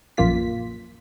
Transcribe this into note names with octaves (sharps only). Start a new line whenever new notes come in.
A#1 F#2 A#3 F4 B6